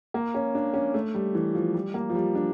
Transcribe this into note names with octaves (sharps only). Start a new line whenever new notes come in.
A#3
C#4
D4
C#4
A3
G3
E3
F3
G3
A#3
F3
G3
D4